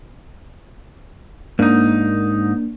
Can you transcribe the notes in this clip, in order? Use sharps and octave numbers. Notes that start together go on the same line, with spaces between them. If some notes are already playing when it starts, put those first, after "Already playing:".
G#2 A#3 D4 D#4